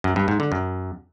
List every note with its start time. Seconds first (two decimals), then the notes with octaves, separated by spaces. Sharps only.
0.04 F#2
0.16 G2
0.28 G#2
0.40 D3
0.52 F#2